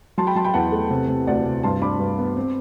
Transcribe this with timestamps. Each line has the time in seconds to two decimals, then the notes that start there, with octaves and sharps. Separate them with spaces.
0.18 F#3 A5 C6
0.27 G5 B5
0.35 F#3 A5 C6
0.45 G5 B5
0.54 E2 F#5 A5
0.72 A3
0.90 C3
1.08 C3
1.27 D2 D5 F#5
1.46 C3
1.63 G2 A5 C6
1.82 D4 B5 D6
1.99 G2
2.19 B3
2.37 C4